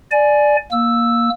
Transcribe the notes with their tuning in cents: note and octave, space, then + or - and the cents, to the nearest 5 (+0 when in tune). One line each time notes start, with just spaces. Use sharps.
D5 +5 G#5 +20
A#3 +10 E6 +0